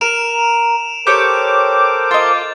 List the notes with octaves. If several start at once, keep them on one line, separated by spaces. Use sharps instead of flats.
A#4 D7 E7 F7
G4 A4 A#4 C5 C#5 D6 G6
F4 D#5 A6